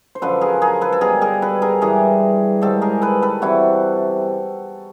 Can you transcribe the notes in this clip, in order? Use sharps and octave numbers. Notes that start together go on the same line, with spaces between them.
C5
F#2 D3 F3 A4 B4
G#4 A#4
G#4 A#4
A4 B4
A4
B2 G3 G#4 A#4
G#4 A#4
A4 B4
G#4 A#4
G2 E3 G3 G#4 A#4
G#2 D#3 G3 G4 A4
G#4 A#4
A4 B4
A4 B4
C3 E3 G3 E4 F#4